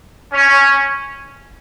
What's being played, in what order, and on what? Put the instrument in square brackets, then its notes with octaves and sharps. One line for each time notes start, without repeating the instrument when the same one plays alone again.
[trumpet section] C#4